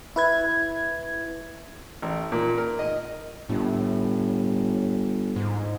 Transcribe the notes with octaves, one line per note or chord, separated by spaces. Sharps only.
E4 B4 G#6
A1
A#2
A#4
D#5
G1 A2
G#2